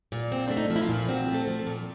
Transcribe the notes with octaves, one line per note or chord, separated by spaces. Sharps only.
A#2
C4
A3 D4
D#4
F3
E4
F4
A#2
C4 F#4
A3
A4
F3
A4
A#2